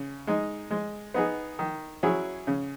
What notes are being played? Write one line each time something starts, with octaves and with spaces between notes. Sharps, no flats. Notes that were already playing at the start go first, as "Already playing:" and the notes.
Already playing: C#3
G#3 D#4
G#3
B3 D#4 G#4
D#3
F#3 C#4 E4 G#4
C#3